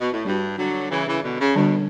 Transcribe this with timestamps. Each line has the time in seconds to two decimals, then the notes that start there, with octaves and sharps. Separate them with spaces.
0.01 B2
0.12 A2
0.25 G2 G3 D4 F#4
0.57 D3 F#3
0.90 C#3 E3
1.07 C#3 E3
1.23 B2 D3
1.39 C#3
1.56 B2 D3 G3 D4